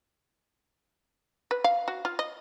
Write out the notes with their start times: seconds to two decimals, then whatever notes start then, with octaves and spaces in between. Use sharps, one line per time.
1.51 B4
1.64 F5
1.88 F#4
2.05 F4
2.19 D#5